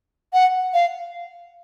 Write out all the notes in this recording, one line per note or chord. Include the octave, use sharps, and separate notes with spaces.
F#5
F5